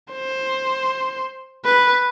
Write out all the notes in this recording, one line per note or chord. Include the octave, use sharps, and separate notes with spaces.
C5
B4